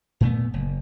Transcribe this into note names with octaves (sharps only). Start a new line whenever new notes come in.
A#2 A3 B3
F#1